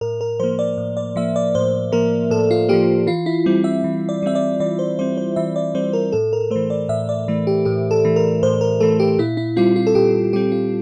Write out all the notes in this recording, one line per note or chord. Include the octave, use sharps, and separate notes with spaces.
A2 A#4
A#4
F3 A#3 C5
D5
A2
D5
F3 A#3 E5
D5
A2 C5
F3 A#3 A#4
A2 A4
F4
F3 A#3 G4
E3 F4
E4
G3 C4
E5
E3
D5
G3 C4 E5
D5
E3 D5
C5
G3 C4 C5
C5
E3 E5
D5
G3 C4 C5
A#4
A2 A4
A#4
E3 A3 C5
D5
A2 E5
D5
E3 A3
G4
A2 G4
A4
E3 A3
A#4
A2 C5
A#4
E3 A3 A4
G4
A#2 E4
E4
G3 C4 F4
F4
A4
A#2 G4
G3 C4 G4
F4